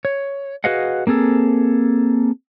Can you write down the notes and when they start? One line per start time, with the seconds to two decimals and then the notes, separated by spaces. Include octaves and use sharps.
0.05 C#5
0.64 F#4 G#4 B4 D#5 F5 F#5
1.07 A#3 C4 G#4 A4